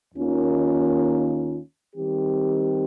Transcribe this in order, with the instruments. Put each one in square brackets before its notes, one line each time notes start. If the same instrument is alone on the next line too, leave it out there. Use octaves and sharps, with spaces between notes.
[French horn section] D#2 D#3 A#3 C#4 F4
D#3 G3 C4 G4